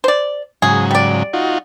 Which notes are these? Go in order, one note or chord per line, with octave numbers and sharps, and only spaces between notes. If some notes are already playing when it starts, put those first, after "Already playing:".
C5 D5
G#2 C#3 F#3 G#4
G3 D5
D#4 F4 F#4